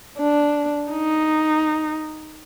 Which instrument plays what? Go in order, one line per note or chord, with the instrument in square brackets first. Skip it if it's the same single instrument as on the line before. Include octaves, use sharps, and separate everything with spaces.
[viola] D4
D#4